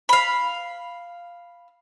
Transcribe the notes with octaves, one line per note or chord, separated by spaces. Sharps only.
F5 B5